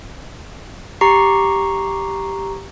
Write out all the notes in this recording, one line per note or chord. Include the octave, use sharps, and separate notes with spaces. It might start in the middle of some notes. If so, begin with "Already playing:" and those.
G4 A#5 C#6 C7